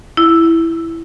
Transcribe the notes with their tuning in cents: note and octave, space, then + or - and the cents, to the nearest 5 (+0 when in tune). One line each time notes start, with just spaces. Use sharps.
E4 +5